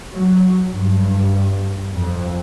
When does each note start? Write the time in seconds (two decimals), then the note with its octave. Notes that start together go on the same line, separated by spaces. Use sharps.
0.12 F#3
0.69 G2
1.92 F2